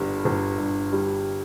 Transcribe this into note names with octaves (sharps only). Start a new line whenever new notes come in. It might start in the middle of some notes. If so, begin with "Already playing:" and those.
Already playing: G1 G2 G3
G1
G2
G3